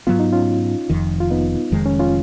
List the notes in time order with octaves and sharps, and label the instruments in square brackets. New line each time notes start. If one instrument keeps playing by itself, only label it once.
[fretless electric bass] G#2 F#3 B3 [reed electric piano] F4
[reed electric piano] D#4
C#4 F4
[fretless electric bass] F1 F2 D#3
[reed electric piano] F4
B3 D#4
[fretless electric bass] F1 F2 D#3 G#3
[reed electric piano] C#4
C#4 F4